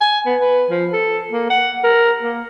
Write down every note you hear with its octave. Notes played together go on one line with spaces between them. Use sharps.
G#5
B3
B4
F3
A4
A#3
F#5
A#4
A#3